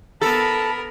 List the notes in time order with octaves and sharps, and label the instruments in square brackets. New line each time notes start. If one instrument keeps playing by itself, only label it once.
[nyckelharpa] B3 A#4 [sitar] A4 [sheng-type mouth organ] A5 [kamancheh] B5